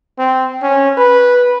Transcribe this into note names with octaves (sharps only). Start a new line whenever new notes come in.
C4
C#4
B4